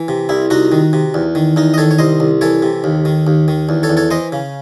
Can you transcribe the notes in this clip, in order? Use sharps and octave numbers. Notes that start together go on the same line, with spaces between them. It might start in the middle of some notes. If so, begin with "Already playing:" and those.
Already playing: E3
C3
C2 E4
C2 D#4 F#4
D#3
C3
E2
D#3
E2 D#4
D#5
D#3 A4 C#5
C#5
C2 C5 D#5
C2
E3 A4 C#5
C3
D#2
D#3
D#2
D#3
E2
A4 C#5
E2
A4 C#5
E3 C5 D#5
C#3